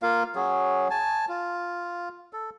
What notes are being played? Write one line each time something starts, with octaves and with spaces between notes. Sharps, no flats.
A#3 F4 F5
F#3 C#4 G#4
G#5 A5
F4
A4